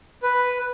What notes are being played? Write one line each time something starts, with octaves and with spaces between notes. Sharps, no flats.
B4